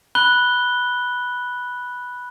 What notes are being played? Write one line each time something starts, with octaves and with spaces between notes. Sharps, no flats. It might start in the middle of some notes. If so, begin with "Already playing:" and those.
B5 F#6 G7